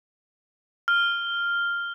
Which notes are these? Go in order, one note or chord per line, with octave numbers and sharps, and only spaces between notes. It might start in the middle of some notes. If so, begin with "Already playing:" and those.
F6